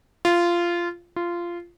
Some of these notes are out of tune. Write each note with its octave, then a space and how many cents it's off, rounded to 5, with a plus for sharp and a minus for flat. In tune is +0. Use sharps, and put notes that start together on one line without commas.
F4 -15
F4 -15